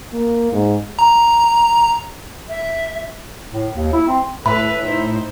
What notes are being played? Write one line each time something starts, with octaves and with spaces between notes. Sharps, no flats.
A#3
G#2
A#5
E5
A2
D#2
E4
C4
A2 A4 B4 E5 B5
D#4 E4 C5